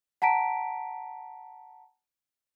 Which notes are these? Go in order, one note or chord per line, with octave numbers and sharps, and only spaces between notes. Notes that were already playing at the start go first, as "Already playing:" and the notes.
F#5 A5 A#5 B6 D7